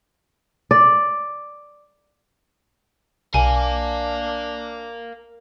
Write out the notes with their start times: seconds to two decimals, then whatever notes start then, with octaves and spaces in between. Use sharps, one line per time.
0.71 D5
3.34 B1 D4 A#4 F5 G#5